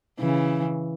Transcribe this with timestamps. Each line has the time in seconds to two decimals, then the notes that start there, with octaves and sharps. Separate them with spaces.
0.20 C#3 E3